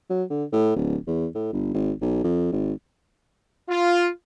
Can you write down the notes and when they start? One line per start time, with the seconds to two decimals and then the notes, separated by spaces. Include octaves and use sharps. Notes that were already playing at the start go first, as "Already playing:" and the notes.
0.10 F#3
0.30 D3
0.53 A2
0.76 D1
1.07 E2
1.35 A2
1.53 G1
1.74 G#1
2.01 B1
2.24 F2
2.52 G#1
3.69 F4